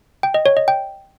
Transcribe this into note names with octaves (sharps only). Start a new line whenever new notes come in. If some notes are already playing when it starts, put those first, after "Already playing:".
G5
D#5
C#5
D#5
G5